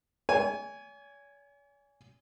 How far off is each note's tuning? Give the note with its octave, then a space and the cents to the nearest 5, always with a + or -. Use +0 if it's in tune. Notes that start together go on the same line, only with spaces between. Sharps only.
C#5 +45 G#5 -5